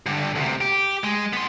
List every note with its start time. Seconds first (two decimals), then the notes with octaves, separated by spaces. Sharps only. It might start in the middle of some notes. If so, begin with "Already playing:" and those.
0.06 G2 D3
0.35 D2 C3
0.61 G4
1.04 G#3
1.33 B3 C6